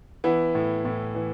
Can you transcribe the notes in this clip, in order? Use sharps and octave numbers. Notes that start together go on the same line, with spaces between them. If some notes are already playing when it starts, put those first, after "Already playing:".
E3 B3 E4
A2
A2
E3